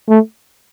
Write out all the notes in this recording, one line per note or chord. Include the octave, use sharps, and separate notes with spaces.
A3